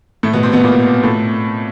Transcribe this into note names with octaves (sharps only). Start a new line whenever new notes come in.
A2 A3
B2 B3
C3 C4
B2 B3
A#2 A#3
A2 A3